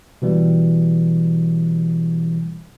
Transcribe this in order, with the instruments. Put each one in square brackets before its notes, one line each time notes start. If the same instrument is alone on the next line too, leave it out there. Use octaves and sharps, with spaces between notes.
[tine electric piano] B2 E3 G3